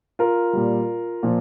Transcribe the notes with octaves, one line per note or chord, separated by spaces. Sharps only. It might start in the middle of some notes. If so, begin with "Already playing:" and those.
F4 A#4
A#2 G3
A#2 F3